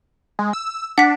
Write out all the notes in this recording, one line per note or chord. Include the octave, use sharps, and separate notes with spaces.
G#3
E6
D4 F#5 B6